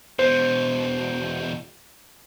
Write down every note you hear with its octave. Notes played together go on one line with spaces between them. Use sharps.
E2 B2 C5